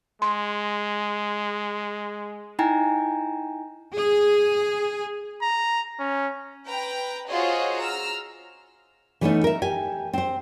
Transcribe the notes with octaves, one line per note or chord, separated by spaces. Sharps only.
G#3 C6
D#4 E4 G5 G#5 A#5
G#4
A#5
C#4
B4 G5 A#5
F4 F#4 G#4 C5 C#5 D#5
A#5 E6 F6
E3 G3 A3 B3 C#4 D#4
A#4 E5
G4 G#5
C4 C5